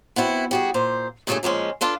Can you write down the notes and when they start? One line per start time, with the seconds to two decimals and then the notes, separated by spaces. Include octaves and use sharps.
0.16 B3 C4 E4 F#4
0.51 G3 F#4 G#4
0.74 A#2 C5
1.27 G2 A#2 C#3 A3 A4 G#5
1.43 A#2 F3 G#3 C#4
1.81 D4 F4 A4 B4